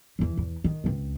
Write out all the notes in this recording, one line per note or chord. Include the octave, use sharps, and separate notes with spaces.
E2 E3
E2
D#3
C#2 C4